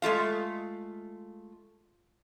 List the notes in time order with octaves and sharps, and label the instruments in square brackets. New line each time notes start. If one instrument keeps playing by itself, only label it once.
[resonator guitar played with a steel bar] G#3 A3 F4 F5